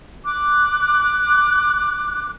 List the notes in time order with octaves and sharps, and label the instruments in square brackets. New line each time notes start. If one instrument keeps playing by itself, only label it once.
[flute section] D6 F#6